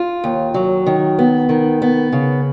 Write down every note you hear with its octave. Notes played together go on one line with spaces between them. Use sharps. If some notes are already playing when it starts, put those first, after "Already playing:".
Already playing: F4
D#2
F#3
D#3
B3
D#3
B3
C#3